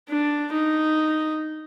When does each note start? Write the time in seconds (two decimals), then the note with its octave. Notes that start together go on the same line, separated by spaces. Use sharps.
0.09 D4
0.53 D#4